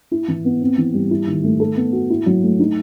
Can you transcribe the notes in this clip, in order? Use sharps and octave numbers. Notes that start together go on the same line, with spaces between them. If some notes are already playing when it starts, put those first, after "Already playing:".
E4
E3
B3
C4
E3
G3
E4
D#3
A3
A4
B3
F#4
E4
F#3
A3
D#4